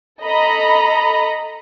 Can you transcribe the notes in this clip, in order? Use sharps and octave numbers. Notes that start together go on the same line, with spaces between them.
A4 D#5 A#5 B5